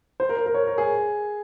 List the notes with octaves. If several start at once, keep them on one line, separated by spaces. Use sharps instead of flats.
C5
A#4
C5
A#4
C#5
A#4
G#4